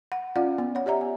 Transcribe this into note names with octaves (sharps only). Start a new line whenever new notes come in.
F#5
C#4 F4 D5 F5 F#5
B3
C#5 F#5
G4 D5 E5 A#5
G#5